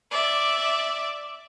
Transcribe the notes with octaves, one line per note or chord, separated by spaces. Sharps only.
D5 E5